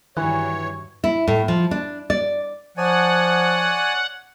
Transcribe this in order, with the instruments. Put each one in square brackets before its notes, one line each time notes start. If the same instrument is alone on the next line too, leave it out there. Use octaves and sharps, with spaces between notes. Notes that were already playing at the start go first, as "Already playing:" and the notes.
[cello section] G2 F#3 [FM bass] D#3 [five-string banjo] E3 [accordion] C#5
[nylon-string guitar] E4
A2
F3
D4
D5
[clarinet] F3 [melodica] C#5 D5 G#5 [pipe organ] F#5